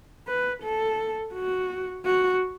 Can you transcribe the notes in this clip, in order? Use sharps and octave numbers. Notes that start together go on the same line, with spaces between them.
B4
A4
F#4
F#4